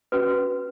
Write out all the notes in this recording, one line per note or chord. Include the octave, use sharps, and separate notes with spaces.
C#4 F#4 B4